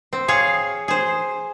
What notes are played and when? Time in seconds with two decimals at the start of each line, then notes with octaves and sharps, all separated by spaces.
0.13 C4
0.28 G#4 C#5 F5
0.88 G#4 C5